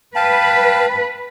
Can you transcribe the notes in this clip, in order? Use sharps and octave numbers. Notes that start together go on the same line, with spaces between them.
B4 F5 G5 A5